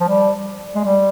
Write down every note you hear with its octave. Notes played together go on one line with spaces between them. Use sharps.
F3
G3
G#3
G3